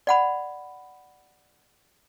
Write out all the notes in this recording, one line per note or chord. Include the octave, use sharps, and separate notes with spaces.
D5 F#5 B5